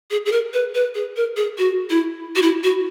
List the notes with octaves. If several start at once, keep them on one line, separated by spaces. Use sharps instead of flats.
G#4
G#4
A#4
B4
B4
G#4
A#4
G#4
F#4
E4
F#4
E4
F#4